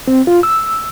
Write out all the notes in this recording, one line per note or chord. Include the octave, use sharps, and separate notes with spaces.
C4
F4
E6